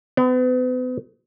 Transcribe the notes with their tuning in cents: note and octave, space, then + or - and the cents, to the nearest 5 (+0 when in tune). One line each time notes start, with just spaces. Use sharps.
B3 +40